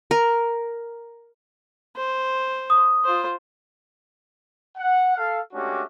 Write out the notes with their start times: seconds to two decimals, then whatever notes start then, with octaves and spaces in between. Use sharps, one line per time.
0.11 A#4
1.96 C5
2.70 D#6
3.04 F4 C5
4.77 F#5
5.16 A4 F5
5.53 G#3 A3 C#4 D4 F#4 G4